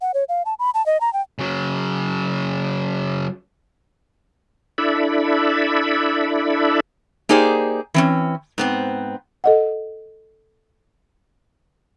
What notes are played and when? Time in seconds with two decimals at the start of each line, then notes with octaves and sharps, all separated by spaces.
0.01 F#5
0.14 C#5
0.29 F5
0.45 A5
0.59 B5
0.74 A5
0.86 D#5
1.01 A#5
1.13 G5
1.39 C#3 F#3
4.78 D4 E4 A4 D5 E5 B5
7.29 A#3 D#4 G4 G#4 C5 D5
7.94 E3 C4 C#4
8.58 G#2 B3 C4
9.44 A4 D#5 F#5